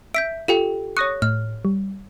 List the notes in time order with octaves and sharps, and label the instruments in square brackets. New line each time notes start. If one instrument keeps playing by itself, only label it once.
[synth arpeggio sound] E5 [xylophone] G6 B6 D7
[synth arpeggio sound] F4 [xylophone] G4 A4 G5
[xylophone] C#5 F#6 [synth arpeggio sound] C#6 D#6 A#6
[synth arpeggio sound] A2 [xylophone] F6
[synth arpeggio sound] G3